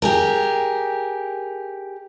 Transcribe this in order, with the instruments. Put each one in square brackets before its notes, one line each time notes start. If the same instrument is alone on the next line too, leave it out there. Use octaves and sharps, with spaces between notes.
[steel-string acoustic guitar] G4 G#4 A#4